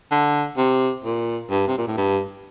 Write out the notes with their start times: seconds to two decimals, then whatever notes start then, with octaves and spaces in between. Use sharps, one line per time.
0.11 D3
0.57 C3
1.04 A#2
1.50 G2
1.68 C3
1.78 A#2
1.88 A2
1.97 G2